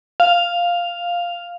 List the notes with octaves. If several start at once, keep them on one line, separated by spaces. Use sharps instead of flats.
F5